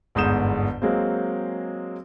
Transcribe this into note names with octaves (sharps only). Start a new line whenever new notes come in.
G1 E2 G#2 D#6 G6 E7
F#3 G#3 A#3 C4